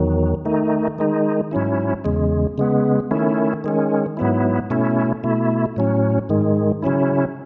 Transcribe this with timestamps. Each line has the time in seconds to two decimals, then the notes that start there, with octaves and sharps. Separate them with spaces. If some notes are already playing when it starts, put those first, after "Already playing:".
Already playing: E2 D#3 F#3
0.45 D#3 A3 D#4
0.98 D#3 G#3 D#4
1.51 G#2 F#3 C#4 E4
2.04 E2 C#3 G#3
2.58 C#3 G#3 B3
3.11 D#3 A3 C#4 E4
3.64 D#3 G#3 C#4
4.17 G#2 F#3 B3 E4
4.70 B2 A3 C#4 E4
5.24 B2 A3 E4
5.76 A2 F#3 C#4
6.29 G#2 D#3 G#3
6.82 C#3 F#3 C#4 E4